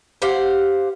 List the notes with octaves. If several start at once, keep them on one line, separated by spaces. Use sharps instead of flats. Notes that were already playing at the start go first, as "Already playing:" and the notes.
G4 C5 F5 F#5